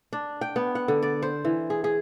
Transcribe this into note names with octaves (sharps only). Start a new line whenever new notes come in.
D4
G5
B3
F#5
D3
D5
C5
E3
G#4
G#4